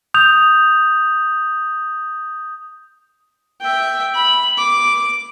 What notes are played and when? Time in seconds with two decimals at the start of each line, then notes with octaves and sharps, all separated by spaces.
0.14 D#6 G6 F7
3.61 E5 G5
4.14 B5
4.57 D6